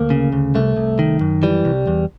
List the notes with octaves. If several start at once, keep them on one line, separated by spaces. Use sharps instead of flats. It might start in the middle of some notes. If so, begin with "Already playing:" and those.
Already playing: D2 A#3
C#3
D2
C2 A3
C2
D#3
F#2
E3 G3
C2
E2